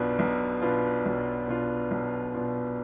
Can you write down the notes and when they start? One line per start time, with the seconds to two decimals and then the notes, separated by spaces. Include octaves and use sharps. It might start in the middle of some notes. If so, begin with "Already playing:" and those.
Already playing: B1 B2 B3 D4 F4
0.19 B1
0.62 B2 B3 D4 F4
1.06 B1
1.48 B2 B3 D4 F4
1.91 B1
2.34 B2 B3 D4 F4